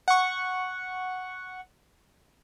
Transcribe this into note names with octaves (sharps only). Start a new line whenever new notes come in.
F#5 C#6